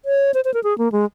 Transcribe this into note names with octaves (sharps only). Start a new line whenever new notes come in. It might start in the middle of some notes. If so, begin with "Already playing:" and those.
C#5
C5
C5
A#4
G#4
A#3
G#3